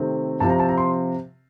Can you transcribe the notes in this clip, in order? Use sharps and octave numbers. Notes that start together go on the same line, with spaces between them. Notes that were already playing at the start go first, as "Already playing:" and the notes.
Already playing: C3 D#3 A3 C4
C3 F3 C4 A5
A#5
A5
A#5
C6